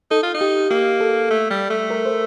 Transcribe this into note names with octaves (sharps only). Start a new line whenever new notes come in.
D#4 A4
F4
D#4
G4
A#3 G4
A4
A3
G3
A3
A#4
C5